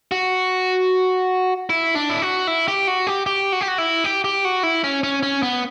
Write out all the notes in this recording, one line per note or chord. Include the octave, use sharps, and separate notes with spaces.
F#4
E4
D4
E4
F#4
E4
G4
F#4
G4
G4
F#4
G4
F#4
E4
G4
G4
F#4
E4
C#4
C#4
C#4
B3